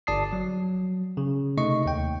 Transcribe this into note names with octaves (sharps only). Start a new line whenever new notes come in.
G1 D5 A5 D#6 C7
F#3
C#3
C3 A3 D#4 D#5 C#6
D#2 G5